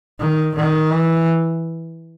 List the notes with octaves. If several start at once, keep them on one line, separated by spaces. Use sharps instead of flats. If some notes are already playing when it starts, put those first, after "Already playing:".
D#3
D#3
E3